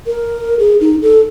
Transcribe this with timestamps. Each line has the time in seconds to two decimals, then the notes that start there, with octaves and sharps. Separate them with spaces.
0.06 A#4
0.59 G#4
0.81 D#4
1.02 A4